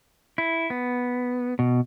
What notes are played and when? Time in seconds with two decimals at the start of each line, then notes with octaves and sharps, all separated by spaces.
0.38 E4
0.70 B3
1.59 B2